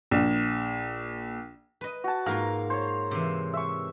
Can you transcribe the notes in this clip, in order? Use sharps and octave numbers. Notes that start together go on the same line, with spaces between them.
A#1
B4 D#5
F#4 A5
G#2 A#3 F4 F5 A#5
C5 C#5
C3 E3
E5 C#6